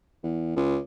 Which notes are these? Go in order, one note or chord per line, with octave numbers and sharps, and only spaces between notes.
E2
C#2